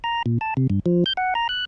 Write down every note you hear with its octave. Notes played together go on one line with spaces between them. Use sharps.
A#5
A#2
A5
C3
G2
F3
G6
F#5
A#5
F#6